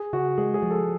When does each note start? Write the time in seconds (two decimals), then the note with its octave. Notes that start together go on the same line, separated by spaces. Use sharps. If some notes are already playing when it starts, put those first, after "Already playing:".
Already playing: G#4
0.13 C#3 F#4
0.38 G#3 G#4
0.54 G#4
0.62 F3
0.71 A4